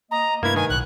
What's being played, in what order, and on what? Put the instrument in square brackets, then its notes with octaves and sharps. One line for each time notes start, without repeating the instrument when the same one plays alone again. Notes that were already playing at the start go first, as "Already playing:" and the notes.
[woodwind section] A#3 D#5 [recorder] A#5
[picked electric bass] G2 [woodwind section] C3 A3 B4 [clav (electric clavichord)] A#3 E4 [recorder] G#6
[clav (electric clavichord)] D#3 [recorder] G#5
[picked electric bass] B1 [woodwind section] A2 [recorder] F#6